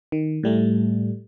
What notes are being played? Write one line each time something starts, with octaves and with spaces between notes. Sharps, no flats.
D#3
A2 G3 A3